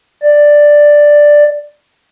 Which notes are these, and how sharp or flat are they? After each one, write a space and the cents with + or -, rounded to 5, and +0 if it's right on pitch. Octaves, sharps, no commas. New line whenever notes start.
D5 +5